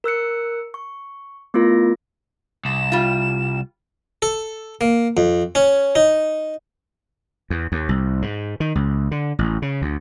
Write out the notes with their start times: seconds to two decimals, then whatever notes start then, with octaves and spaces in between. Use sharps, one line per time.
0.04 A#4 E6 F#6 C#7
0.74 C#6
1.54 A3 B3 E4 F4 A#4 A#6
2.65 C2 E7
2.92 G3 F4
4.22 A4
4.81 A#3
5.17 F2
5.55 C#4
5.95 D#4
7.50 E2
7.72 D#2
7.89 C2
8.22 G#2
8.60 D#3
8.75 C#2
9.11 D3
9.39 A1
9.62 C#3
9.82 D2